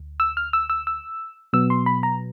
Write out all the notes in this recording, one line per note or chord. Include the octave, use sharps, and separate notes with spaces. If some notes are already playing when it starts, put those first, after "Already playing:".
Already playing: D2
E6
F6
E6
E6
E6
B2 F#3 B3 E6
C6
B5
A#5